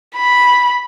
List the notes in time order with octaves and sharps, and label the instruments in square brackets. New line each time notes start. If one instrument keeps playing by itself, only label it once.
[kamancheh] B5